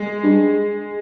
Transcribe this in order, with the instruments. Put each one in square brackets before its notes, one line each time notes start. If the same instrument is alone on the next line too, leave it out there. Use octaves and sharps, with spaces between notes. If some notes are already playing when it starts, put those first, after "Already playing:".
Already playing: [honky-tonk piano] G#3
[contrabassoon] G2